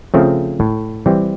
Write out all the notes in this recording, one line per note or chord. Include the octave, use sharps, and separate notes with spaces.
C#3 F3 A3 C4
A2
E3 G3 C4